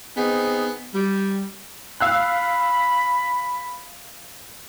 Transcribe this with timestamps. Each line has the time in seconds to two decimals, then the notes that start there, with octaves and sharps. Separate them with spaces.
0.17 B3 C4 D#4 G#4
0.94 G3
2.00 F5 B5 E6 F#6